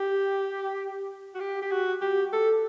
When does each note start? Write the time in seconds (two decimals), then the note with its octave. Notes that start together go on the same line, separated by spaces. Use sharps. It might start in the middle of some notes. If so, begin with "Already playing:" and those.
Already playing: G4
1.35 F#4
1.40 G4
1.62 G4
1.71 F#4
2.01 G4
2.33 A4